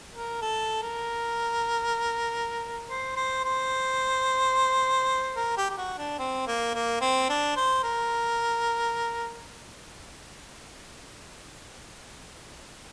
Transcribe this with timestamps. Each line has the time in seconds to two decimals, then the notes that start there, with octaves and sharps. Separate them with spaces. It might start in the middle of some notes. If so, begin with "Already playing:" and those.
0.14 A#4
0.42 A4
0.82 A#4
2.89 C5
3.16 C5
3.44 C5
5.36 A#4
5.57 G4
5.70 G4
5.78 F#4
5.98 D4
6.19 C4
6.47 A#3
6.74 A#3
7.01 C4
7.29 D4
7.57 C5
7.83 A#4